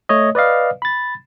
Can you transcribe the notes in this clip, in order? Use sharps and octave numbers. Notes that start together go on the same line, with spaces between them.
A3 C#5 D#5
B4 D5 D#5 F5
B5 A6